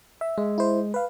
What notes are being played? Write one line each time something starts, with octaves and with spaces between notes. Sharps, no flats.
E5
G#3
E4 C5
B4 F5